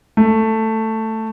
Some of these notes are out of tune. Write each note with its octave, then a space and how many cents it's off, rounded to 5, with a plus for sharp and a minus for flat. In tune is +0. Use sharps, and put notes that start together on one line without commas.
A3 +10